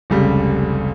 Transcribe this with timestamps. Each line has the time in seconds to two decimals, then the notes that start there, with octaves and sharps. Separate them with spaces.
0.10 F1 C#2 G3